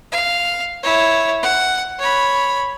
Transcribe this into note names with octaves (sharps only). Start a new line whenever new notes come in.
F5
E4 C#5
F#5
C#5 B5